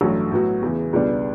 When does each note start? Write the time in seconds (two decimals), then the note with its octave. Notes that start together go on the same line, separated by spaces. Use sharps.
0.01 A1 G2 F#3 A3
0.31 A2 F#3 B3 F#4
0.62 E2 C#3 E3
0.93 C#2 B2 G3 B3 D4